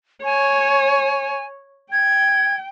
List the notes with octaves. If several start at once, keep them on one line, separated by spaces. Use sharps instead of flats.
C#5 G#5
G5 G#6